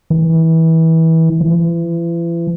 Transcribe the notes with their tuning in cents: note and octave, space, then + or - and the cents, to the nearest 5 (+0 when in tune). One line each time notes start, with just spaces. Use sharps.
E3 -25
E3 +40